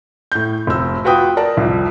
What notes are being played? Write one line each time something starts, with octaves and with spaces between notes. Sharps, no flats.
A2 G6
F1 E6
F4 F#4 B4 G5 D#6
A#4 D5 A5
C2 F2